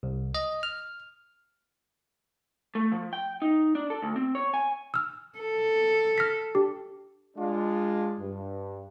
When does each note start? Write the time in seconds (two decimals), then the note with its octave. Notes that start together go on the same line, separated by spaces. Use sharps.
0.03 C2
0.35 D#5
0.63 F6
2.75 A3
2.92 F3
3.13 G5
3.42 D#4
3.75 D4
3.90 A4
4.02 D2
4.16 C4
4.35 C#5
4.54 G#5
4.94 E6 F6
5.39 A4
6.18 F6 A#6 B6
6.55 D4 G4
7.37 G#3 D4 F4
8.19 G2